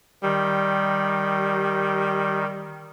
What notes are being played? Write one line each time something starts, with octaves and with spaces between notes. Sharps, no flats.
D#3 G3